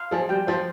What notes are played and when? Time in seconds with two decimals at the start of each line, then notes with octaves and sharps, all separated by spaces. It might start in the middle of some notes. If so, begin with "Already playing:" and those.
Already playing: F5
0.11 F3 G#4
0.29 G3 G5
0.47 F3 C5